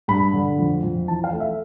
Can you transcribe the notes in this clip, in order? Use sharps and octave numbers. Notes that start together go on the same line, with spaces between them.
G2 B5
D3
F2
F2
E3 A5
F5
A3
E5